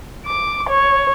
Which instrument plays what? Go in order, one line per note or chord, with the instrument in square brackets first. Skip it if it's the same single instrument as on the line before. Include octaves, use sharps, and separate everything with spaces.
[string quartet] D6
C#5